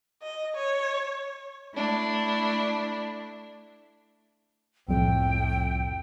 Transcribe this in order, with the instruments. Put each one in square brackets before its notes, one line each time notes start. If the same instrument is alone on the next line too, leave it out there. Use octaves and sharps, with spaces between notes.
[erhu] D#5
C#5
[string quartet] A3 D4 E4
[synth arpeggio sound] C2 F2 [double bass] A2 [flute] G5